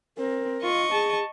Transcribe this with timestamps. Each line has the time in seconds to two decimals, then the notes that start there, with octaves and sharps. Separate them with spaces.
0.17 C4 A#4
0.63 F4 D#5 C#6
0.92 G#4 A5